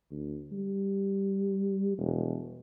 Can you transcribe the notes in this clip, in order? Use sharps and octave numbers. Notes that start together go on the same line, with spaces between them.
D2
G3
E1